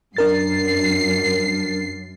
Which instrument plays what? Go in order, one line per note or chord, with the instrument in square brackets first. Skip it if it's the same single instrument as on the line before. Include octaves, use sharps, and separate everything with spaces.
[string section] F#2 C7 [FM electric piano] D4 A#4 A6